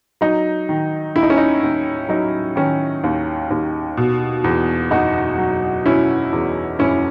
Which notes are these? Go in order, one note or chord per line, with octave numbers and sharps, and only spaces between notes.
F#3 D#4
D#3
D#2 E4
D#4
C#4
D#4
D#2
F#3 D#4
D#3 C#4
D#2
D#2
B2
E2
F#1 D#4 F#4
F#3
B2 C#4 E4
E2
F#1 C#4 E4